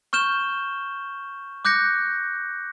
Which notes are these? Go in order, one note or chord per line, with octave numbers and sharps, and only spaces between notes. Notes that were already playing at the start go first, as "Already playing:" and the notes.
C#6 F6 G6 E7 G7
D6 F#6 G6 A#6 C#7